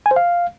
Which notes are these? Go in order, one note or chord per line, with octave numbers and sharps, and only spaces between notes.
G#5
C5
F5